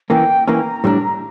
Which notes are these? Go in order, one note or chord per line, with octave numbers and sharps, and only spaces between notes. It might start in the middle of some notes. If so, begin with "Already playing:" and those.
E3 A#3 C#4 G5
E3 A#3 C#4 A#5
A2 G3 D4